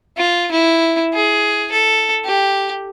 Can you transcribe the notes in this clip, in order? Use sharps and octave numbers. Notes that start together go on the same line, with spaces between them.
F4
E4
G#4
A4
G4